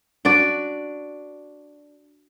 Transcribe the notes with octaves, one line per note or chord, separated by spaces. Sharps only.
D4 F#4 D5